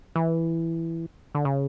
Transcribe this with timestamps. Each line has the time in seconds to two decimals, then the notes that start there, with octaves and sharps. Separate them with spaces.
0.16 E3
1.35 D3
1.45 C#3